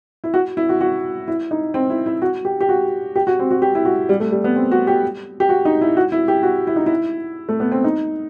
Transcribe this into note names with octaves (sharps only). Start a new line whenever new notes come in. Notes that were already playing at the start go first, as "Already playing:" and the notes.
E4
F#4
E4
F#4
F#4
E4
D#4
C4
E4
E4
F#4
G4
G4
F#4
G4
F#4
C4
F#4
G4
E4
F#4
G3
A3
G3
B3
C4
F#4
G4
G4
F#4
D#4
E4
F#4
E4
G4
F#4
E4
D#4
E4
A3
B3
C4
D#4